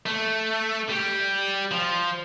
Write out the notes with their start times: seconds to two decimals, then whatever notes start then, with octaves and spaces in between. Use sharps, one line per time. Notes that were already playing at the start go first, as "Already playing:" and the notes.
0.06 A3
0.89 G3
1.71 F3